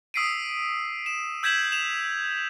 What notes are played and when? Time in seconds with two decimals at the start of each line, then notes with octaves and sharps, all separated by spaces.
0.14 D#6 E6 B6 C7 D7 D#7
1.06 E7
1.43 E6 G6 G#6 B6 E7 F#7
1.72 E7 F7